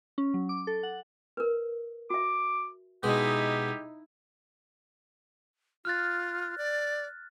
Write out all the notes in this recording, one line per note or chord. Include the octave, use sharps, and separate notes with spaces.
C#4
F#3
D6
A4
F#5
A#4 B4
F#4 E5 D6
B2 G#3 D#4 E4 G4
F4 F6 F#6 A6
D5